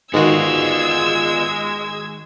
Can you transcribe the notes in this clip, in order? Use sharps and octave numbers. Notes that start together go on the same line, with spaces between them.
G#2 D#3 G#3 B3 F4 F#4 E6 G#6